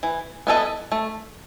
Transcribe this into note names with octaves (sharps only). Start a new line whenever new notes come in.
E3
B3 E4 A4 D#5
A3